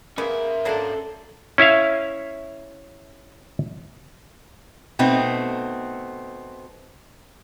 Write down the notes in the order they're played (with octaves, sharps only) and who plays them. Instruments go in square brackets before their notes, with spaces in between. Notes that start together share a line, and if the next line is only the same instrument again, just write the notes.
[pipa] C#3 B3 [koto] A#3 [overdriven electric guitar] C#4 E5
[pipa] F#3 A#3 D4 [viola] A4 [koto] C5 A5
[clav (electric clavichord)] C#4 E4 E5 F5
[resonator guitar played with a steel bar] B2 A3 B3 C4 D#4